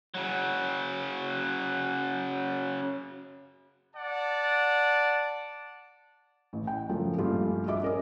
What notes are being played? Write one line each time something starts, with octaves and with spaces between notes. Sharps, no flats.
C#3 F#3
D5 F#5 A5
A1
G5
F#2 C#3 F3 A3
A#1 G2 A3 F4 G4
F#4 G#4 D#5 E5 D6
C#4 A#4 D#5